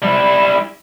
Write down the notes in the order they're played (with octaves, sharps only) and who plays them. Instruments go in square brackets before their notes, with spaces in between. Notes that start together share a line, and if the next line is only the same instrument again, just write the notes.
[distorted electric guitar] G3 E4